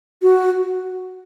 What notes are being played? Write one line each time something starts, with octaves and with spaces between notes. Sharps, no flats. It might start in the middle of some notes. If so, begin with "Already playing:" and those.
F#4